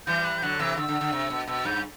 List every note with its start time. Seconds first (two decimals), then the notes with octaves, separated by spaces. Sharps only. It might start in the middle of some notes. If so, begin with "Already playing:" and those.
0.07 E3 G3 G6
0.24 F#6
0.38 G6
0.42 D3 F#3 F#6
0.59 C3 E3 E6
0.77 D3 E6
0.89 D3
1.01 D3
1.12 C3
1.30 B2
1.47 B2 E6
1.65 G2 G6